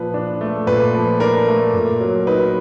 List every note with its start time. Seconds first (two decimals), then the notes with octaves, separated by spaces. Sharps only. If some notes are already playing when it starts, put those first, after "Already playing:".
Already playing: A#2 F3 B4
0.14 D4
0.41 A3
0.67 A#2 B4
0.94 F3
1.20 D4 A#4
1.47 A3
1.74 A#2
2.00 F#3
2.27 D#4 B4